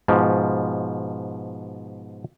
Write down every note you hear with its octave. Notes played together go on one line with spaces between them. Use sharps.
G#2 B2 F3